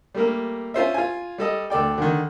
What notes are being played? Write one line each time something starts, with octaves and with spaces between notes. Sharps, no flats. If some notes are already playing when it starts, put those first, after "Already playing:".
G3 A3 A#3 A#4
C#4 F4 C5 E5
F4 G#5
G3 A4 D#5
D2 A4 D5 G5
D3 D#3